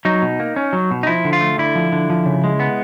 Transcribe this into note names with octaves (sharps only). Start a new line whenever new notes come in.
F#3 D#4
B2
A#3
C#4
F#3
B2
D#4
F3 E4
D3
F4
A3
D3 E4
F3
D3
F3
C#3
G#3
B3